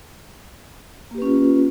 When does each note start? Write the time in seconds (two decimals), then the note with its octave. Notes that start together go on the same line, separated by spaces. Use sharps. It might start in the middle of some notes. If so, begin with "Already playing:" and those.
1.11 A#3
1.15 G4
1.18 B4
1.22 C#4
1.25 F4